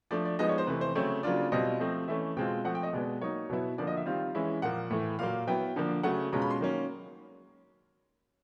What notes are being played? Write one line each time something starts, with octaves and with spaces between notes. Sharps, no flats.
F3 A3 D4 D5
D5
F3 G#3 B3 D#4 D#5
C#5
C5
C3 E3 A3 B4
C5
C#3 F#3 A3 C4 C#5
C#3 F#3 A#3 D4 F4 D5
B2 G3 C4 F4 D#5
F3 A3 C4
E3 A3 C#4 E5
B2 G#3 C4 F4 G5
F3 A3 C4 F#5
G5
D#5
B2 G#3 B3 D5
F#3 A#3 D#4 C#5
B2 F#3 B3 E4
D3 F3 A#3 D5
D#5
E5
D#3 G3 C4 F4 F5
E3 G#3 C#4 E4
A#2 F3 A#3 F#5
A2 E3 A3
A#2 F#3 A#3 F5
F#3 B3 E4 G5
D3 F3 A#3 D4
C#3 F#3 A3 F#5
B2 G#3 C#4 F4 A#5
B5
C6
D#3 F#3 A#3 C#4